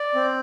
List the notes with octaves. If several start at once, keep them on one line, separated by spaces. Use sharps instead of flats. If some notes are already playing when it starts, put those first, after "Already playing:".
Already playing: D5
C4